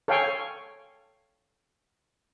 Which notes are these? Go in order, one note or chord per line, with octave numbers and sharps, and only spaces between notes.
A4 C#5 F5 G5 G#5 C#6